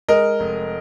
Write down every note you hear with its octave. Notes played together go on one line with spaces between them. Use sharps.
G#3 A#4 D#5
F1